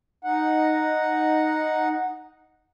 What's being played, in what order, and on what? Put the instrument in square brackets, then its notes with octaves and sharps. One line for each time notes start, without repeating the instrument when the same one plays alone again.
[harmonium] D#4 F#5